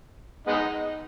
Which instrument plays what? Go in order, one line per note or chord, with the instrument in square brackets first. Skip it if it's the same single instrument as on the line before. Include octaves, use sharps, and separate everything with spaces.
[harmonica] G#3 B3 D#4